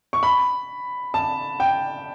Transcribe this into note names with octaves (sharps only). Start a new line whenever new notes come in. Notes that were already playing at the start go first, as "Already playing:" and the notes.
C#6
B5
A5
G5